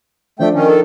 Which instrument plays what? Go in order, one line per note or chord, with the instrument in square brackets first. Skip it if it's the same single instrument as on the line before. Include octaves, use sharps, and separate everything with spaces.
[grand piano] F3 D4 [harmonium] A3 G5
[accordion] D#3 [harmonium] C#4
[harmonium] A4